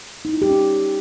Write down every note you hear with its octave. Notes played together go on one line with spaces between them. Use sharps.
D#4
E4
G4
C#4